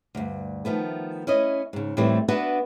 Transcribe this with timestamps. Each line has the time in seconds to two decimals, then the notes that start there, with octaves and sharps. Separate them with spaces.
0.15 D2 G2
0.65 D#3 F3 A3 B3
1.27 C#4 E4 C#5 D#5
1.73 G#2 C#3
1.97 A2 E3 G3 A3 C4
2.28 B3 D4 F#4 B4 E5 F#5